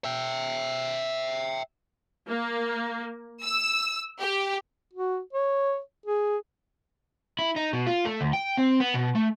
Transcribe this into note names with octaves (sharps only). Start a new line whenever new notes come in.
E5 G5
A#3
E6
G4
F#4
C#5
G#4
E4
D#4
B2
F4
A3
D2
G5
C4
B3
B2
A3